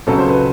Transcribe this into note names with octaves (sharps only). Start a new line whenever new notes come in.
C#2 C#3 F#3 A4
C5
B4